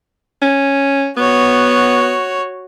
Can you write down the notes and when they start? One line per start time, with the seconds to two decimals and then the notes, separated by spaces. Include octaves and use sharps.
0.42 C#4
1.17 B3 F#4 C#5